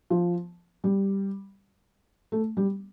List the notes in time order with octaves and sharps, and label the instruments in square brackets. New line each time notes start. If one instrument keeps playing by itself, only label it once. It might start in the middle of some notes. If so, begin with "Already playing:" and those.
[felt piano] F3
G3
A3
G3